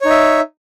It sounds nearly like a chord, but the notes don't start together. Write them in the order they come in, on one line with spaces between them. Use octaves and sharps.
C#5 D#4 E5